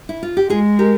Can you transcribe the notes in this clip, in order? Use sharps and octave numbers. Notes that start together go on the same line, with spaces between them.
E4
F4
G4
G#3 F4 G#4
G4 A#4